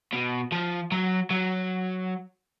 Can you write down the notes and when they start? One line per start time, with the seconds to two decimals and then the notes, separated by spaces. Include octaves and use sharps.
0.13 B2
0.52 F3
0.92 F#3
1.30 F#3